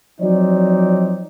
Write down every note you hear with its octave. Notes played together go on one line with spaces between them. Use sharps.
F3 F#3 C4 D#4 C#5 D5